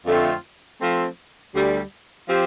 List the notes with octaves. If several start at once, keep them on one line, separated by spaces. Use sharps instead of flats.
F2 D3 A3 C4 F4
F3 A3 C4
D2 D3 G3
F3 C4 G4